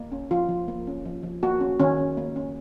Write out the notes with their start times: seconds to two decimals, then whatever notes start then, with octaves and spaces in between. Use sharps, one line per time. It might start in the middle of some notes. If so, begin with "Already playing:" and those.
Already playing: A#3
0.12 C#4
0.31 F3 F4
0.49 F3
0.68 A#3
0.87 C#4
1.05 F3
1.23 F3
1.43 A#3 F#4
1.60 C#4
1.80 D#3 C#4
1.98 D#3
2.17 A#3
2.36 C#4